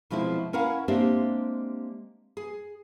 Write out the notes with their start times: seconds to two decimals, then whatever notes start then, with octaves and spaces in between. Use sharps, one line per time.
0.10 B2 F3 G#3 C4 E4
0.53 C#4 E4 A#4 F5 F#5
0.88 G#3 A#3 C4 D4 G4 E5
2.37 G#4